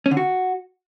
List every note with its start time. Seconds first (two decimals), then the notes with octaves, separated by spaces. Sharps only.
0.06 C#4
0.11 D3
0.17 F#4